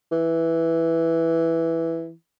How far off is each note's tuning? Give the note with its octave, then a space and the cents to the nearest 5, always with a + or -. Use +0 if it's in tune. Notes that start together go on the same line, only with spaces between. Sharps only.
E3 +0